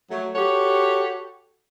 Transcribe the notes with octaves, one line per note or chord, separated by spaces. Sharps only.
F#3 A3
F#4 G4 A4 C#5